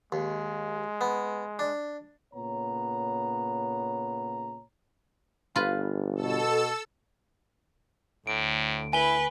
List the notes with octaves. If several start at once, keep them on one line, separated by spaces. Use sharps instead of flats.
D#2 G#3
B3
D4
A#2 C#3 B3 C#5 A#5
G1 F4 B4
B2 A4 E6
D2 A2 D7
E4 B4 G#5 G7